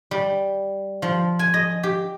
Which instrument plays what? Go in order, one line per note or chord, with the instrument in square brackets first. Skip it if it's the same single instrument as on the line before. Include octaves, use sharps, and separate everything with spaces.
[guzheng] G3
F3
G#5
D#5
G4